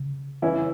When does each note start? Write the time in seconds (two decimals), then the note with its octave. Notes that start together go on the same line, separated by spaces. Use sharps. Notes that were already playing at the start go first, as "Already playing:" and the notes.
Already playing: C#3
0.42 E3 C#4 E4